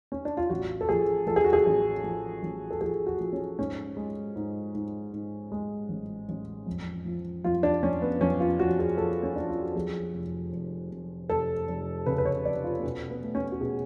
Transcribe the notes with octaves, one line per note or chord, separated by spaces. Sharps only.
C#4
D4
F4
A1 F#4
A4
F3 G#4
F3 A4
G#4
F#4
G#4
A1
F3
A1
A4
F3 G#4
F#4
F3
C#4
G#2 C#4
G#3
G#2
G#2
G#2
G#3
A1
A1
F2
F3
F2 F4
D4
F2 C#4
B3
F2 C#4
F4
F3 F#4
G#4
F3 A4
C#4
F3 D4
F4
F#4
F2 G#4
F1
F1
F1
F1 A4
F1
C#3 B4
B4
C#5
F1 D5
F4
B3
B2 C#4
B3
A3
C#4
F#4
B2 G#4